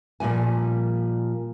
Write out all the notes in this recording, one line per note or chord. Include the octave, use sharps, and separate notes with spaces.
A#2 F3 G3 G#5